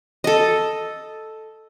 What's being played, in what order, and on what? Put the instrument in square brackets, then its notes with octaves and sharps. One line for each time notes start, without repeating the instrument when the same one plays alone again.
[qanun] A4 D#5